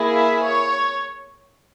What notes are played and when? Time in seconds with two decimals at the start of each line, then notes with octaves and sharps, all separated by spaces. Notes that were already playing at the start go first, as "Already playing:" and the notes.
Already playing: A#3 E4 G#4
0.15 E5
0.44 C#5